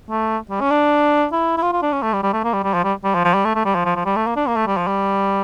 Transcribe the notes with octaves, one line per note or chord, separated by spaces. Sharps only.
A3
G3
C#4
D4
E4
E4
F4
F4
D4
C#4
A3
G3
G3
A3
A#3
G3
G3
F3
G3
G3
F3
F3
G3
A3
A3
G3
F3
F3
F3
G3
A3
A#3
D4
A#3
A3
G3
F3
G3